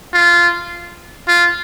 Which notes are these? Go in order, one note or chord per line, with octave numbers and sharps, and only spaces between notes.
F4
F4